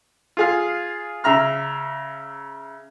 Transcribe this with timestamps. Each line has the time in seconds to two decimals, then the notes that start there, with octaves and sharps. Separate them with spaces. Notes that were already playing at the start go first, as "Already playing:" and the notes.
0.37 F4 G#4 F5
1.24 C#3 E5 A#5 F6